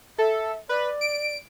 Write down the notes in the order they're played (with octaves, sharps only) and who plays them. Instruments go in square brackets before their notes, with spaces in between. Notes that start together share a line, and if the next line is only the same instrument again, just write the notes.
[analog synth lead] A4 [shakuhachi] E5
[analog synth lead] B4 [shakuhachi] D5
[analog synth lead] D7